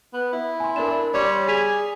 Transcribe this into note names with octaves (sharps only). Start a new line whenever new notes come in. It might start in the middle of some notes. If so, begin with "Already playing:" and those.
B3
E4
G#5 C6
D4 A#4 E7
G3 C#5 D5 C6
G#4 B6 D#7 F7